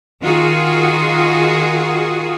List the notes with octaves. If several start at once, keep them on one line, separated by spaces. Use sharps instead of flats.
D#3 F4 F#4 G#4